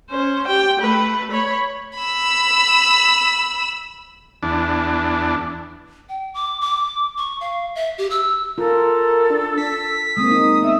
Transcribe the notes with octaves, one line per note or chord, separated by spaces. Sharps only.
C#4 C5
G4 G5
A3 B4
C#5 B5
B5 E6
E2 D4
G5
D6
D6
C#6
F5
E5
G4
E6
F4 A4 A#4
D4
B6
G#3 A#3 C4 D#6
D#4
B3 E5